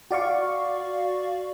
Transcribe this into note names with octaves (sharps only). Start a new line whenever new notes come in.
F#4 D5 F5 C#6